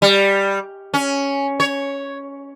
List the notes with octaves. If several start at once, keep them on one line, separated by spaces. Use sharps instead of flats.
G3
C#4
C#5